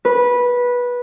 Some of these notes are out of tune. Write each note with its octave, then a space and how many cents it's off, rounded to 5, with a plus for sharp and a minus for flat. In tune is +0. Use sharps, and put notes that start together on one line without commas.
B4 -15